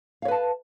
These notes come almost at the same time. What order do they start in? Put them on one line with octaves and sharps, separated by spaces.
F5 C#5 B4 A5